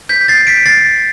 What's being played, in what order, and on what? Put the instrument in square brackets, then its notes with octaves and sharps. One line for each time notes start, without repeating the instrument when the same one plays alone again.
[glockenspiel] G6 B6
A6 C7
B6 D7
A6 C7